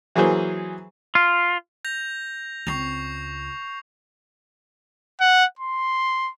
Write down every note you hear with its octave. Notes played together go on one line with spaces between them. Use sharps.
E3 F#3 A#3 G#4 C5
F4
G6 A#6 F7
C#2 C4 C#6 C7 F7
F#5
C6